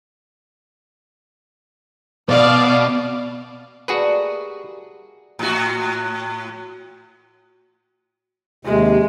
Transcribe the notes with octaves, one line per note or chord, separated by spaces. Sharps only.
B2 D5 F5
G3 A3 A#3 F#4 G#4 B4
A2 F#4
D#2 C3 G#3